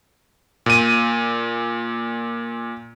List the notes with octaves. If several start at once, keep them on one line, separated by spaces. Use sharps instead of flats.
A#2 D#7